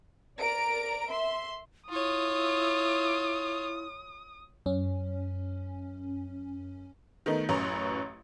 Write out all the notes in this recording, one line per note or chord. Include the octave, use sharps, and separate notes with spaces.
A#4 D5 A#5 D7
E5 C6
E4 F4 C#5 D#6
F#2 C#4
D#3 A3 B3 D#4
A1 F#2 C#4 B4 C#5 A#5